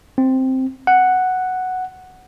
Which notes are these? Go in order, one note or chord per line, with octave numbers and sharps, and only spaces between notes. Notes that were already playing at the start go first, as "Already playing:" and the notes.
C4
F#5